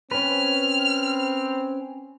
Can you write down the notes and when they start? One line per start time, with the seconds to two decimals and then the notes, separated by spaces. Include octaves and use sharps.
0.11 C4 C#4 B4 F6